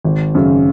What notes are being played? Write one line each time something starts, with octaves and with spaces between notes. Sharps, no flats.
G#1
F#2 C#3